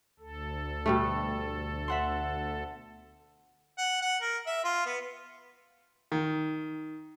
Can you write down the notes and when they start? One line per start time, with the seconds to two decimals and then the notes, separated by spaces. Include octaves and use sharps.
0.19 D2 A4
0.86 B2 G3 A3
1.88 E5 F#5 C6
3.78 F#5
4.02 F#5
4.22 A#4
4.46 E5
4.64 F4
4.86 B3
6.12 D#3